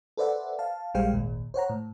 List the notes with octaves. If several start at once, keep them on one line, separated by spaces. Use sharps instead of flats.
A4 B4 C5 D5 E5 F#5
F5 A5
A#1 G3 G#3 C5 F5 G5
G#1 D#2 A#2
C5 C#5 F#5 A#5
A2